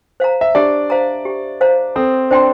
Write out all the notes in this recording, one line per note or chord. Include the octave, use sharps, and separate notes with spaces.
C5 F5 A#5
E5
D4 G4 D5
C5 F5 A#5
G4
C5 F5 A#5
C4 A4 C5
D4 C5 G5 C6